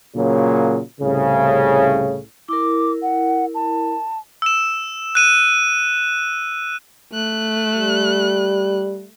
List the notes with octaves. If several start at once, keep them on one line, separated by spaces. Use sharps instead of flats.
A#2 C#3 F#3 A#3
C2 A2 C#3
E4 A#4 D6
F#5
A5
E6 E7
F#6 D#7 E7
A3 F#6
G3